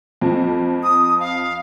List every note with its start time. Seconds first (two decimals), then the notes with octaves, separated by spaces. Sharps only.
0.21 F2 F3
0.83 D#6
1.20 F5